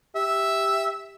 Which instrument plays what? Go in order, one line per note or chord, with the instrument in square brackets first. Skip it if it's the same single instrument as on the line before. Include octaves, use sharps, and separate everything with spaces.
[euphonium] G4 [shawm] E5